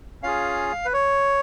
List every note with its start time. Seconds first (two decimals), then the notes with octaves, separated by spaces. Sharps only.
0.23 C#4 F4 G#4 F5
0.85 B4
0.93 C#5